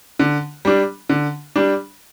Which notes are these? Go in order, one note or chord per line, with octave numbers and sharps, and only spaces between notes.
D3
G3 D4
D3
G3 D4